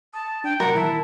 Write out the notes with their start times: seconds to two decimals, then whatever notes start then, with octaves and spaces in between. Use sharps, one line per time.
0.14 A5 D#6
0.44 D4 G5
0.60 C3 F#3 A#4 F#5
0.75 A#2 D#3 E3 E4 A5